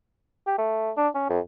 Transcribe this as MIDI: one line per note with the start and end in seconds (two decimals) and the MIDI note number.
0.47 0.55 67
0.58 0.91 57
0.97 1.08 62
1.15 1.27 61
1.30 1.40 41